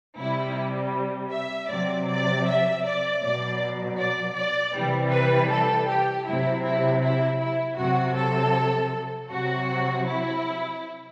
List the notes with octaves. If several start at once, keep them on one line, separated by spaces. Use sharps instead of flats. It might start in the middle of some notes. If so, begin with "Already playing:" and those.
C3 G3 E4
E5
C3 F#3 D5
D5
E5
D5
B2 F#3 D5
D5
D5
C3 E3 G3
B4
A4
G4
C3 F#3 E4
E4
E4
E4
C3 F#3 F#4
A4
C3 F#3 F#4
E4